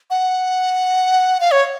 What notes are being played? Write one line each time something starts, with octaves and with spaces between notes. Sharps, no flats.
F#5
F5
C#5